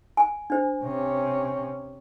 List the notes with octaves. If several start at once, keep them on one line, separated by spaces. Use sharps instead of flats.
G#5
D4 C5
C3 C#4